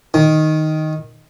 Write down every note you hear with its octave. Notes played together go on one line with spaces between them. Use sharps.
D#3